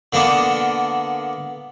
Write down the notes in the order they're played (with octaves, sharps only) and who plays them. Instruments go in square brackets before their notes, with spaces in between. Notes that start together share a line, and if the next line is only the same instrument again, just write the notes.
[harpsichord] D3 A#3 B3 D4